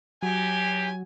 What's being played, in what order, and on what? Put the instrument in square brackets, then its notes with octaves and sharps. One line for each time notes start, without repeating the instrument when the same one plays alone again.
[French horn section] E2 G4 [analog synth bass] F#3 [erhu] G#5